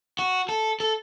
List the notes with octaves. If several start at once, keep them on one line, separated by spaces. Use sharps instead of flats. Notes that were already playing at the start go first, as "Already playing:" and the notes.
F#4
A4
A4